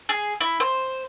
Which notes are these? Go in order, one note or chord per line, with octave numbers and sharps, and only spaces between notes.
G#4
E4
C5